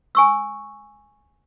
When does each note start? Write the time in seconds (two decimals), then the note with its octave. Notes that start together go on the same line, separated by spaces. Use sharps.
0.15 G#5 C#6 E6